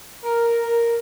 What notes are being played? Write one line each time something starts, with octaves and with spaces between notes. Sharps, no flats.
A#4